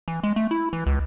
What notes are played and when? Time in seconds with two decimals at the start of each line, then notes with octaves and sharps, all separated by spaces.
0.08 E3
0.23 G#3
0.36 A3
0.51 E4
0.73 E3
0.86 C#2